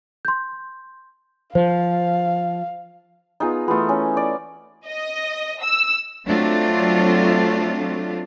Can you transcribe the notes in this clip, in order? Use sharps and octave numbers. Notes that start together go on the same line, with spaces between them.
C6 G6
F3 C5 F5
B3 D#4 F4 G#4
E3 A3 B3 F4
C#4
D5
D#5
E6
F#3 A3 C4 D4 F4